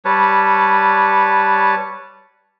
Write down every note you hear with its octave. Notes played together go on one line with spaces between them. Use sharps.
G3 B4 C#5 A5